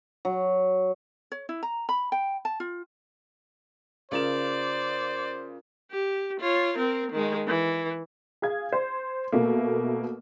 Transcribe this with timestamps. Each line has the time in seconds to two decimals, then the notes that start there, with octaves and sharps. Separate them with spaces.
0.25 F#3
1.32 C#5
1.49 E4
1.63 A#5
1.89 B5
2.12 G5
2.45 A5
2.60 F4
4.12 C#3 F4 A#4 C5 D5 E7
5.91 G4
6.40 F4 C#5
6.77 C4 A#4
7.12 D#3 G#3
7.47 E3
8.42 G#4 F5 G#6
8.73 C5
9.32 B2 A3 A#3